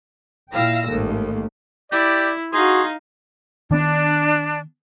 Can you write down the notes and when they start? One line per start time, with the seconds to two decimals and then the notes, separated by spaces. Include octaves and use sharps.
0.53 A#2 E4 F5 G5 E6 A#6
0.89 A1 D#2 G#2 A3
1.92 E4 G4 D5
2.53 D#4 F#4 G#4 F5 C6
3.71 D#3 B3 D4